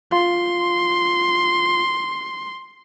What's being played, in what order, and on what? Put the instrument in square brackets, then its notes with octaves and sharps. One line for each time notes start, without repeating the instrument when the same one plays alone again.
[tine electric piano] F4 [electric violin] C6